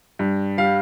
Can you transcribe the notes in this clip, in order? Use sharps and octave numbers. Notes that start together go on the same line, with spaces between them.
G2
G3 F5